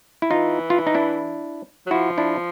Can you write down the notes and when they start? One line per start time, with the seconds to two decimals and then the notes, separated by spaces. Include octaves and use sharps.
0.22 E4
0.31 E3 D#4 F4
0.70 F4
0.79 E4
0.87 D#4
0.95 D4 E4
1.86 F#3
1.91 F3 E4 F#4
2.18 D4 E4